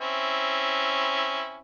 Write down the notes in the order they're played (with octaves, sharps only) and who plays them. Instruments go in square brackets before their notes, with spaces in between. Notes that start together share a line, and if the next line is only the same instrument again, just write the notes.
[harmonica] C4 C#4 E4